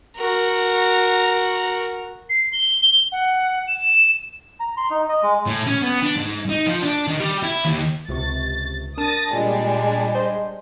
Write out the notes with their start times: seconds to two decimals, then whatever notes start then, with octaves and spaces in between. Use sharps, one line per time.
0.17 F#4 A#4
2.30 C7
2.53 G7
3.12 F#5
3.68 E7
4.60 A#5
4.77 C6
4.90 D#4
5.09 D#5
5.23 G#3
5.46 A2
5.67 C#4
5.83 B3
6.03 D4
6.16 G#2
6.49 D#4
6.66 F3
6.82 D4
7.07 D#3
7.20 G3
7.43 E4
7.65 D#2
8.08 C#2 C3 C#6 A6
8.98 D4 A#4 A5 D#6 A6 A#6
9.33 A#2 G3 G#3 D4
10.15 C5 D#5 C6